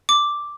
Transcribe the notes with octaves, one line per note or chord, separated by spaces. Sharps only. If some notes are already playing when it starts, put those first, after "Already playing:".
D6